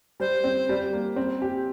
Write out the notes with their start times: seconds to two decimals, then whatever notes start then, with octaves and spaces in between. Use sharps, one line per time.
0.20 G3 C5
0.44 C4
0.69 G3
0.93 A#3
1.16 C4
1.42 G4